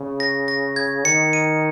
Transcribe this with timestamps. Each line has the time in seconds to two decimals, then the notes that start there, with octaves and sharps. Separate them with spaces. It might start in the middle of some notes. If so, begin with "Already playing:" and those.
Already playing: C#3
0.20 A#6
0.48 A#6
0.76 G#6
1.04 D#3 C#7
1.33 D#7